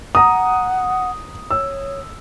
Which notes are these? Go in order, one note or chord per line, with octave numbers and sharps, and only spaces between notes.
F#5 A#5 D#6
C#5 E6